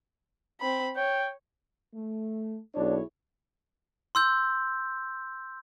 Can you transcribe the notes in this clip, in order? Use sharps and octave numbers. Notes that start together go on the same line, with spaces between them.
C4 B5
C#5 G5
A3
B1 D4 E4 G#4 C#5
C6 E6 G6